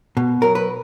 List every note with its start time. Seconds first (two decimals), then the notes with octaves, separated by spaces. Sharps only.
0.17 B2
0.42 F#3 A#4
0.55 B4